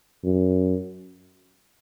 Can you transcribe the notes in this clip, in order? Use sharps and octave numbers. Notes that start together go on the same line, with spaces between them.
F#2